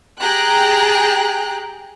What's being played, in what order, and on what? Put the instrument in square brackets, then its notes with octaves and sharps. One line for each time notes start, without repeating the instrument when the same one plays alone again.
[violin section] G4 G#4 G5 A#5 F#6